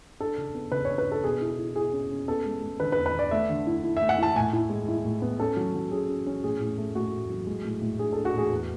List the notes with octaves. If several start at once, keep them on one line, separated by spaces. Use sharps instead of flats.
D4 A4
C#3
B3
C#3 B4
C#5
D4
B4
D4
A4
B2 G#4
E4
E4
E4 G#4
C#4
C#4
B3 A4
G#3
G#3
D3 B4
B4
E2
B4
D3 D5
A3 E5
D3
E4
E4
A3 E5
F#5
E4 A5
A2 G#5
E4
G#3
E4
A2
B3
C#4 A4
F#3
F#3
C#4 G#4
C#4
C#4
A2 G#4
A2
A3
A2 F#4
A3
F#3
G#3
A2
A2
D4 G#4
D4 A4
F#4
A2 G#4
E2